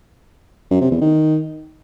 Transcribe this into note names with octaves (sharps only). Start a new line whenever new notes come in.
F#2
C3
E2
D#3